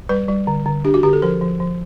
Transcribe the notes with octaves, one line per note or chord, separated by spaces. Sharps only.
G3 B4
G3
D3
D3
D4 G4
F#4
D3 G4
A4
F3 A#4
F3
F3